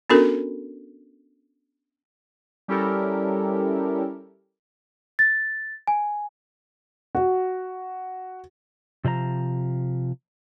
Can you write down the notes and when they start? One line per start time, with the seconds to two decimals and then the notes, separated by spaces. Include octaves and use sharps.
0.10 B3 C#4 D4 F#4 A4 A#4
2.68 G3 C#4 E4 G4 A4 A#4
5.19 A6
5.87 G#5
7.15 F#4
9.04 C3 F3 D5 A#5